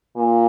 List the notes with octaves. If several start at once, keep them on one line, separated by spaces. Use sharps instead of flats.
A#2